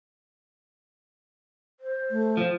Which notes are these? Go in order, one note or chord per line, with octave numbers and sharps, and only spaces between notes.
C5
A3
F3 C4